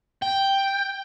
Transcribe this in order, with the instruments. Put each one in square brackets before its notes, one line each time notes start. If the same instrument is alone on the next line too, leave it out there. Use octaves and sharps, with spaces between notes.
[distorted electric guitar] G5